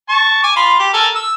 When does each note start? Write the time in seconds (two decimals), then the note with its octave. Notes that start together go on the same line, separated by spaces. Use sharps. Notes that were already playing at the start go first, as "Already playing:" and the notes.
0.09 A5 C#6
0.43 G#5 D6
0.56 F4 B5 C6
0.79 G4
0.93 A4 A#4 G#5
1.15 E6